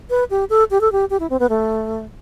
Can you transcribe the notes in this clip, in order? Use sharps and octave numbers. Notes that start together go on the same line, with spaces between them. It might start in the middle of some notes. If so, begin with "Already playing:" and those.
B4
G4
A4
G4
A4
G4
G4
E4
C4
B3
A3